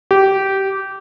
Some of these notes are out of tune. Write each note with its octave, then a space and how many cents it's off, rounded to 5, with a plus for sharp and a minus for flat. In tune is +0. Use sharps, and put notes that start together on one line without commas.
G4 -15